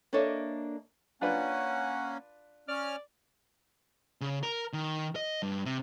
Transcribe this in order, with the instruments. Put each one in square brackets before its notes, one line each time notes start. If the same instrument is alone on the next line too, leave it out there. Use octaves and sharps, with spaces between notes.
[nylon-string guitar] A#3 D4 A4 C#5 D#5 E5
[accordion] A#3 C#4 [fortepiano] D4 F4 B4 [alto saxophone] F#5
[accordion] C#4 F6 [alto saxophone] D5
[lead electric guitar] C#3
A#4
D#3
D#5
G2
C3